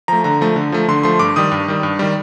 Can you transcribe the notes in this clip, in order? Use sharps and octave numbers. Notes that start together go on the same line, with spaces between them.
F3 A3 A#5
D3 A#5
F3 A3
D3
F3 A3
D3 C6
F3 A3 C6
G2 D6
D#3 G3 D#6
G2
D#3 G3
G2
D#3 G3